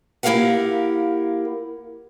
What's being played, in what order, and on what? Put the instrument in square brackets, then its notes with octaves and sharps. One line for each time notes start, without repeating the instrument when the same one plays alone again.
[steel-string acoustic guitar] A#3 E4 G4 A#4 F5 F#5